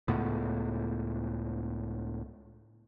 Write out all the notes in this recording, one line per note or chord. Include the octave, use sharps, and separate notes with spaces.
C#2 A2 B3